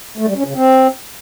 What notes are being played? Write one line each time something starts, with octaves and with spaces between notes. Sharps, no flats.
A3
G3
C#4
C#3
C4